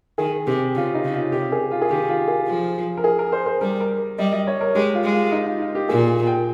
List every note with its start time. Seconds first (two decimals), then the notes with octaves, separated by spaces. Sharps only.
0.18 D#3 G#4
0.47 C3 G4
0.75 C#3 F4
0.94 D#4
1.04 C#3
1.14 F4
1.32 C3 G4
1.52 G#4
1.71 F4
1.82 G#4
1.89 D#3 G4
2.09 F4
2.28 G#4
2.47 F3
2.97 A#4
3.04 G#4
3.19 A#4
3.32 C5
3.46 C5
3.61 G3 A#4
3.81 A#4
4.18 G3 D#5
4.33 D#5
4.47 C#5
4.61 A#4
4.75 G#3 G4
4.94 F4
5.04 G#3
5.13 F4
5.32 D#4
5.46 F4
5.61 F4
5.75 G4
5.89 A#2 G#4
6.27 G5